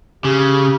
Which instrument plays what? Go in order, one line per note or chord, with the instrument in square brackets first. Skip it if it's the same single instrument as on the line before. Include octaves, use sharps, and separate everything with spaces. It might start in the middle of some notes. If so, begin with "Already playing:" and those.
[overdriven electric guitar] C#3 [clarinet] G4